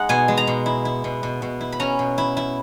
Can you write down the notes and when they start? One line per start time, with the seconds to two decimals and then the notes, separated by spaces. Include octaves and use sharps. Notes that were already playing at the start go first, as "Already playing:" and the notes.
Already playing: G#3 D#4 F#5
0.09 B2 G#5
0.28 G#3
0.37 A#5
0.47 B2
0.66 E4
0.85 E4
1.04 B2
1.23 B2
1.42 B2
1.61 E4
1.72 B5
1.80 C#4 A#5
1.99 B2
2.18 E4
2.37 E4